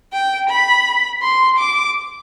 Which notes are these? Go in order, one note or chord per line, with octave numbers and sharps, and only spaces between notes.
G5
B5
C6
D6